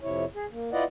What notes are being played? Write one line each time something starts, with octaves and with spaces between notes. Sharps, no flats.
F2 C3 E4 C#5
G#4
A#3
E4 F4 B4 D5 D#5 F#5